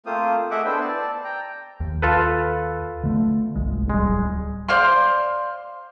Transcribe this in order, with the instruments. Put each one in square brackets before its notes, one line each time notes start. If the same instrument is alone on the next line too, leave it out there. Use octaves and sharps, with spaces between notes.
[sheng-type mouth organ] A3 A#3 C4 F4 C5 D#6
A3 G#4 D#5 E5 F#5 D6
B3 D4 E4 C5 G5
D5 A5
G5 A#5
[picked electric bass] D#2
[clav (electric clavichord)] F4 A4 B4
[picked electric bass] D3 A3
G1 C2 G#3
[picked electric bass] D1 G3 [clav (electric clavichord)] G#3
[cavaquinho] C5 D5 F5 C6